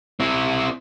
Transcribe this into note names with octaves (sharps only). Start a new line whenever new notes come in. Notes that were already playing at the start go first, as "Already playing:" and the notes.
C4 E4